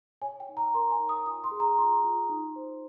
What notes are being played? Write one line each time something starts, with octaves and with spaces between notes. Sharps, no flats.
C#5 G#5
G5
D#4
A#5
A#4 C6
G#5
D#4
D#6
F4 D#6
C6
G#4
A#5
F4 C6
F4
D#4
C5